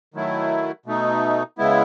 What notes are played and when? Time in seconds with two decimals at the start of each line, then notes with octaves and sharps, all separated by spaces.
0.14 D#3 F#3 A3 E4
0.86 B2 A3 D#4
1.58 C#3 G#3 B3 E4